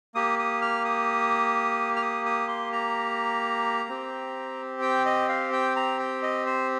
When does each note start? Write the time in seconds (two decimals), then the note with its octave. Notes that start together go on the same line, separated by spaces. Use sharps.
0.15 A#3 G4 D#6
0.39 D#6
0.62 F6
0.85 D#6
1.96 F6
2.02 D#6
2.26 D#6
2.48 C6
2.73 A#5
3.89 C4 G4
4.82 G5
5.06 D#5
5.29 F5
5.53 G5
5.76 A#5
5.99 G5
6.22 D#5
6.46 C5